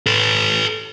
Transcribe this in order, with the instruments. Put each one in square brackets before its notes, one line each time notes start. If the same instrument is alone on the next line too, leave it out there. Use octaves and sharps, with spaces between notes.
[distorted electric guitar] A4 B4